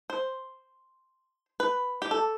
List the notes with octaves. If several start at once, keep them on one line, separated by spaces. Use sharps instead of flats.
C5
B4
G4
A4